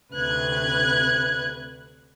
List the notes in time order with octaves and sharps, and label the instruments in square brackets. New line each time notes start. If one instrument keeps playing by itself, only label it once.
[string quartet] D2 C3 B4 F#6 G#6